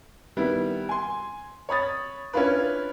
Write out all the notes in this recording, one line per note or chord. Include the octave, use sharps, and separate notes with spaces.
D#3 G3 B3 E4
G#5 C6
C#5 B5 D#6 A6
C#4 D4 E4 F4 B4